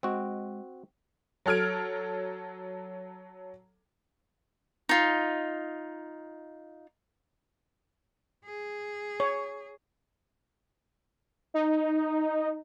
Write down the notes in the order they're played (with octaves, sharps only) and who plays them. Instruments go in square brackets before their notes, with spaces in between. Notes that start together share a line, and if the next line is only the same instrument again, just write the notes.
[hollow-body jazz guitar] G#3 D#5 G5 [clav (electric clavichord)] C4 F#4
[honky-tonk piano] F#3 A4 F6 G#6 D7
[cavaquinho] D#4 F4
[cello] G#4
[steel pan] C#5
[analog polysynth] D#4